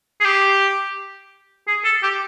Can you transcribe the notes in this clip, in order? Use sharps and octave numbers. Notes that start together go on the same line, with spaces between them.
G#4
G4
G#4
A4
G4